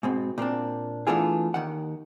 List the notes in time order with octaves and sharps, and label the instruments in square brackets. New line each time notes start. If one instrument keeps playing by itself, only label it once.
[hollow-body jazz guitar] G#2 B2 C4
A#2 A#3 C4 D4
E3 A3 B3 D4 F4 G#4
D#2 D#3 F#5